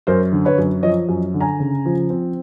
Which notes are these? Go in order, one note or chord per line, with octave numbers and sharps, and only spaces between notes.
F#2 A#4 C5
D3
B4 C#5
F#2
F3 C#5 D#5
F#2
D3
G#5 A#5
C#3
F3
C4